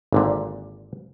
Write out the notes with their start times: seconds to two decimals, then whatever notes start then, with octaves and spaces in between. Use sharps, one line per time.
0.13 G#1 A#2 D3